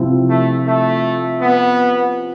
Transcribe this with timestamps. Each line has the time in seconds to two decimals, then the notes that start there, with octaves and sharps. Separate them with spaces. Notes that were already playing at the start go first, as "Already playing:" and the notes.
Already playing: C3 F3 C4 E4
0.29 A3
0.67 A3
1.41 B3